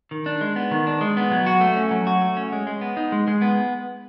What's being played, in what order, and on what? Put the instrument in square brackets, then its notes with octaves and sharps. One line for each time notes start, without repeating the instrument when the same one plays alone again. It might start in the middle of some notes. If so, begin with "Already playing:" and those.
[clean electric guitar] D#3
D4
G#3
B3
D#3
D4
G#3
B3
F#3
F#4
A3
C#4
F#3
F#4
A3
C#4
G#3
G#3
B3
D#4
G#3
G#3
B3